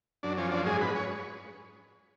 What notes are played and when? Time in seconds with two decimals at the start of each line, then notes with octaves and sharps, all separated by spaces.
0.23 F#2 D4
0.37 F3 C#4
0.51 F#2 D4
0.65 G#2 G#4
0.81 G#2 B4
0.95 C#5